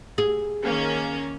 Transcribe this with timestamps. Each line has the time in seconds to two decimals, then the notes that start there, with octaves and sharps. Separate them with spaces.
0.18 G#4
0.64 D#3 A#3 C#4